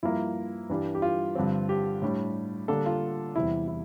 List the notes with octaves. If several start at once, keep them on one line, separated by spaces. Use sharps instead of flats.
G2 F3 A#3 E4
G2 E3 G3 D4
G4
F4
G2 D3 F3 C4
G4
A2 G3 D4
D3 G3 A#3 D4 A4
F4
E2 C3 G3 E4
E4